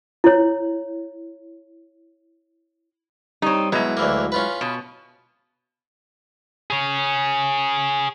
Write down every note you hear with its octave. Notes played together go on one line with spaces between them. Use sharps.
E4 C#5
G3 C4 D#4 C#5
B2 F#3 G#3 E4
D2 E3 A#3
C#4 F4 B4
B2
G#4 C#5